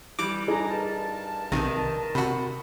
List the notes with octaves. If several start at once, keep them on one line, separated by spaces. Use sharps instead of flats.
E3 G3 D6
D4 D#4 G#4 G#5 A#5
G2 A#4 A5
B1 C3 D#3
C3 F#4 B5